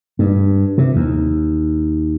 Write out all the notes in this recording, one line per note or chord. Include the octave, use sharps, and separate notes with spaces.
G2
C3
D#2